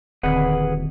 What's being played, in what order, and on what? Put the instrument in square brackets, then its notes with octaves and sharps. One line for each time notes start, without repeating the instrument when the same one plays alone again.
[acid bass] D#1 [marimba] D3 D#3 C4 [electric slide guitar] G#4 B4 F#5